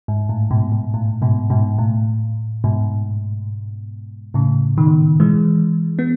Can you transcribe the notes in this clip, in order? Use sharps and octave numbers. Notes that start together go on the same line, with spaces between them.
G#2
A2
G#2 B2
G#2
A2
G#2 B2
G#2 B2
A2
G#2 B2
A2 C#3
B2 D#3
E3 G#3
B3